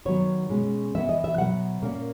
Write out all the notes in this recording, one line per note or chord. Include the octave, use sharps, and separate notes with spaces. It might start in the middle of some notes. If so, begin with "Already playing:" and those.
D#3 F#3 B3 C#5
B2 G#3 C#4
E3 B3 E5
D#5
E5
B2 F#3 B3 F#5
A#2 A#3 C#4